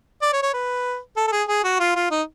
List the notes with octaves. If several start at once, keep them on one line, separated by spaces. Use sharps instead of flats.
D5
C#5
C#5
B4
A4
A4
G#4
G#4
F#4
F4
F4
D#4